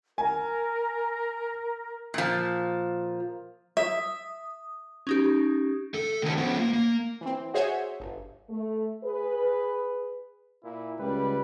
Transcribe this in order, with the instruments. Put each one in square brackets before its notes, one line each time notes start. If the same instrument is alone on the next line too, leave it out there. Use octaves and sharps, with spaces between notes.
[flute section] A#4 [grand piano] G#5
[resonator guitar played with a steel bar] A#2 F3
[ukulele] E5 [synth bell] D#6
[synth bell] C#4 D#4 G4
[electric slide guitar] A3 A4
A2 D3 D#3 F#3 B3 A5
F3 B3 F4
A#3
A#3
[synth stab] E3 C4
F#4 G#4 C5 C#5 E5 G#5
G1
[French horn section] A3
G#4 B4
[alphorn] A#2 [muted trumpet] E4
[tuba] C#2 [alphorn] G3 [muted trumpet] B4